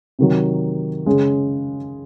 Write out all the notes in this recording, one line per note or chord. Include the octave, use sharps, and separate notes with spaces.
C3 D#3 F#3
C#3 G#3 C#4